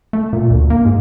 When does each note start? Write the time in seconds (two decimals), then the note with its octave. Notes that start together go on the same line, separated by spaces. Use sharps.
0.13 A3
0.33 A#2
0.51 D2
0.70 A#3
0.85 G#2